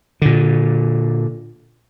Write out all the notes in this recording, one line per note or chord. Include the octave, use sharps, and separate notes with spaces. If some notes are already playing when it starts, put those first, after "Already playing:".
A#2 D3